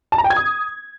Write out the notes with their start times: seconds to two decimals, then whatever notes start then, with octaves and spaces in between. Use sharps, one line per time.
0.12 A5
0.18 A#5
0.24 G5
0.30 G#6
0.36 D#6